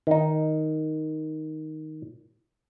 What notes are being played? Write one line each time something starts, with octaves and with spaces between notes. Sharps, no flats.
D#3 D#4